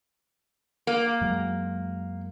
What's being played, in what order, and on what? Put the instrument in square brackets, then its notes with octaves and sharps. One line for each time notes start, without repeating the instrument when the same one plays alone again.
[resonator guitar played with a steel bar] A#3
[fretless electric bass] F#2 F#3 G#3